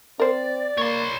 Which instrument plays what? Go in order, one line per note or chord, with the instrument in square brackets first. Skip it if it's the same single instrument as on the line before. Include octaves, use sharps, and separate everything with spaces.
[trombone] C4 [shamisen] A#4 C5 [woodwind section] D5
[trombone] A#3 [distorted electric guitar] C#5 C6